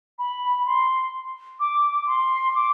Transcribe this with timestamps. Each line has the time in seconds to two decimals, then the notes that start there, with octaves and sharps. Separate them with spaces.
0.19 B5
0.66 C6
1.60 D6
2.07 C6
2.55 D6